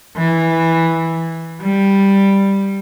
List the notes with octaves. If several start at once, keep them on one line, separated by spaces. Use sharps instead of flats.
E3
G3